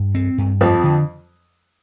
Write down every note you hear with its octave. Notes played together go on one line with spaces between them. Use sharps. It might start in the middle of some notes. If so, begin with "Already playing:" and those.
Already playing: G2
C4
G2
F2 F3 C4
D3